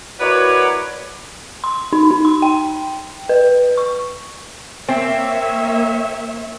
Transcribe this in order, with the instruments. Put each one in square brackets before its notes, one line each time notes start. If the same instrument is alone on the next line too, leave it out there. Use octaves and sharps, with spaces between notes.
[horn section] E4 F#4 A#4 B4 C#5 D5
[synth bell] C6
D#4
D#4
C6
G5
B4
C#6
[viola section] A#3 C#5 E5 [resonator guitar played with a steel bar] C4